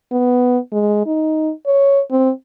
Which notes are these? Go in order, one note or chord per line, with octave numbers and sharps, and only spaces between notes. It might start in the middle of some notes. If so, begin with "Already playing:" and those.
B3
G#3
D#4
C#5
C4